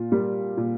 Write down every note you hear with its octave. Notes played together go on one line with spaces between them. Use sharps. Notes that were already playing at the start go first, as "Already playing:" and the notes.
Already playing: A#2 F4
G3 A#3
A#2